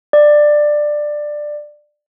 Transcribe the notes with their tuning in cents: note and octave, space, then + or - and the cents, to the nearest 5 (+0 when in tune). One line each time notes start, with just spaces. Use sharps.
D5 +15